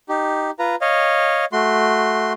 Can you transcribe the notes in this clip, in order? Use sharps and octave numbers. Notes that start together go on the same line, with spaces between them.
D#4 G4
F4 B4 A#5
C#5 D#5 F5
A3 F#4 C6